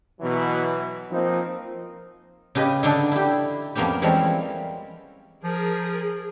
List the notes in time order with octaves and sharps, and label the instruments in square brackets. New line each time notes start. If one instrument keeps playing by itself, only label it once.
[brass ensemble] B2 E3 F#3
F3 A#3 C4 D#4
[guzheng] C#3 G4 B4 D#5
D3 D4 D#4 A4
E4 G4
F2 A#3 B3 C#4 G4
E3 F3 G3 G#3 C4 C#4
[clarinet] F3 [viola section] G#4 A#4